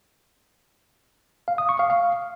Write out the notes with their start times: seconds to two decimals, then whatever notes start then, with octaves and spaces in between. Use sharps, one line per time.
1.48 F5
1.58 D#6
1.69 C#6
1.79 F5
1.90 F5